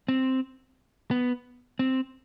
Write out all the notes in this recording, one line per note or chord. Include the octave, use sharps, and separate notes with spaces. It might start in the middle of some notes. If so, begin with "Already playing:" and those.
C4
B3
C4